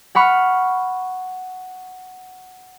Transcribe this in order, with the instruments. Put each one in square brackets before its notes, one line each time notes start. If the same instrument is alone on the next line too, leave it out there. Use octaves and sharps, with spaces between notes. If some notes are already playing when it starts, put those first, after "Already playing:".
[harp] F#5 B5 C#6 F6